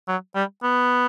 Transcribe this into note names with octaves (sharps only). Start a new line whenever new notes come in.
F#3
G3
B3